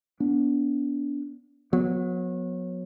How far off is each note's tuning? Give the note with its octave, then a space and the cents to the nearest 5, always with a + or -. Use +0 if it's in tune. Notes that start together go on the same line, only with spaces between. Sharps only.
B3 -15 D4 -35
F#3 -30 B3 +0